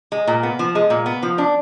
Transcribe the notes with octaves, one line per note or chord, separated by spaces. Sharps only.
G#3
A#2
B3
F3
G#3
A#2
B3
F3
D4